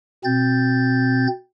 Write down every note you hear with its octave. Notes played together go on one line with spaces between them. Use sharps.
B2 C4 G6 A6